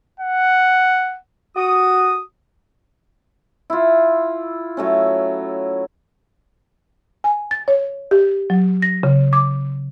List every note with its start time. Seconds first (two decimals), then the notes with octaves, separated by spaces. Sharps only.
0.20 F#5
1.56 F#4 D#6
3.70 E4 F4
4.77 F#3 A3 C#4
7.24 G#5
7.51 A6
7.68 C#5
8.11 G4
8.50 F#3
8.82 A#6
9.03 C#3
9.33 D6